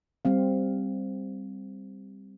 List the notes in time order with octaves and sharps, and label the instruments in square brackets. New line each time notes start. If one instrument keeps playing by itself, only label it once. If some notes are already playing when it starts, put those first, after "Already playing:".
[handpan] G3 C4 F5